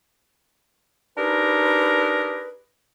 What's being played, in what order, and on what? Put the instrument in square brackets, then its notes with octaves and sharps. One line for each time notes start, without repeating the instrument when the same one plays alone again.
[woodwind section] D4 D#4 G4 G#4 A#4 B4